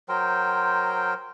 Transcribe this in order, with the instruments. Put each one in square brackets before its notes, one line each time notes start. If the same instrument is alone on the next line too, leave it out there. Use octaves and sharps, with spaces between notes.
[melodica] F#3 A#4 C5 G5